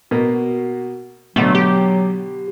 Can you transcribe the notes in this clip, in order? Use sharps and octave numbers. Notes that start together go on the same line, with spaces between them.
B2 A#3 F#4
B2 D3 F#3 A3
G4